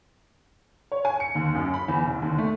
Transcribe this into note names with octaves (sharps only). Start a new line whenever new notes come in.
C#5
G#5
C#7
D#2
F#2
B5
E2
C2
D#2
A3